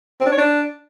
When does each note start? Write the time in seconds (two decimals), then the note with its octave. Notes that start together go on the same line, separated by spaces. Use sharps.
0.21 C4
0.26 D4
0.32 C#5
0.38 D4